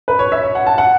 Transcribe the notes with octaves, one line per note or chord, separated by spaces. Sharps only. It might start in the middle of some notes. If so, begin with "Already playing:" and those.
B4
C#5
E5
C#5
F#5
A5
F#5